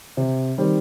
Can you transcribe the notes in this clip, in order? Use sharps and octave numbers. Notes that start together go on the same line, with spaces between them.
C3
D#3 G3 C4